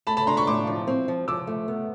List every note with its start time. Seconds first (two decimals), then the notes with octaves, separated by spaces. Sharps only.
0.07 A3 A5 B5
0.17 A5 B5
0.27 D4 A#5 C6
0.37 B5 C#6
0.47 A2 C6 D6
0.67 F3
0.87 C4
1.08 F3
1.28 F3 D6 E6
1.47 A3
1.68 B3